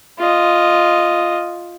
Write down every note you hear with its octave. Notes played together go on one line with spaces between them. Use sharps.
F4 D#5